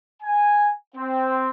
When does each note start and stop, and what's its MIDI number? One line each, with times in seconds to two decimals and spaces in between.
0.23 0.70 80
0.96 1.49 60